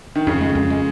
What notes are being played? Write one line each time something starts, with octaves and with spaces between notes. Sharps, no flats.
D#3
F2 C#3
G#3
F2
G#3